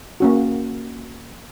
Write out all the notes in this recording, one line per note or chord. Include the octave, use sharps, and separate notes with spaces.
A#3 C#4 F#4